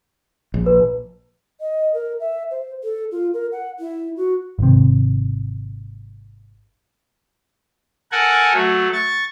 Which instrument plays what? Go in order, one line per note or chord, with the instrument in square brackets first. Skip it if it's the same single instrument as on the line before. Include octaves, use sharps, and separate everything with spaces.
[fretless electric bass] A#1
[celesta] B4
[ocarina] D#5
A#4
E5
C5
A4
F4
A#4
F#5
E4
F#4
[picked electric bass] G#1 C3
[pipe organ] A4 A#4 F#5 G#5
F#3 A3
C#6 A6